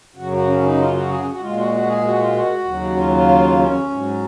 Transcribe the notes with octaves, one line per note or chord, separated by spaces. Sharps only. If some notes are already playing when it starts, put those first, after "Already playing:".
F#2 C#3 F#3 F#4
F#4
C#4
D#4
F4
F#4
G#4
F#4
F#4
A#2 G#3 F4
F#4
F#4
G#4
F#4
F4
F#4
D#2 C#3 F#3
F4
F4
C#4
G#2 F#3